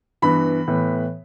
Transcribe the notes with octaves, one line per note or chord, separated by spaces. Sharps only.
G2 E3 B3 B5
A2 E3 B3